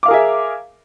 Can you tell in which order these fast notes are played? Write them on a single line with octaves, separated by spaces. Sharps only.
D6 F5 A#4 G#4 E5